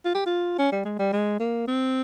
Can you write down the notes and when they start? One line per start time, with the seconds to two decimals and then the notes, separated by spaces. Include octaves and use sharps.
0.05 F4
0.15 G4
0.26 F4
0.58 C#4
0.72 G3
0.85 G#3
0.99 G3
1.13 G#3
1.40 A#3
1.67 C4